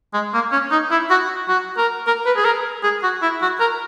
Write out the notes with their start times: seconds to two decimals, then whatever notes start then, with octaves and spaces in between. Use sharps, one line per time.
0.14 G#3
0.34 A#3
0.52 C#4
0.71 D#4
0.91 E4
1.10 F#4
1.48 F#4
1.77 A#4
2.07 A#4
2.25 B4
2.36 G#4
2.45 A#4
2.83 G#4
3.03 F#4
3.22 E4
3.42 F#4
3.60 A#4